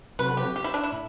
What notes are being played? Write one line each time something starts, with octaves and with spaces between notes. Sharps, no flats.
C3 F#3 C4 F#4 A4 B4
G4
G4
E4
D4
E4
A2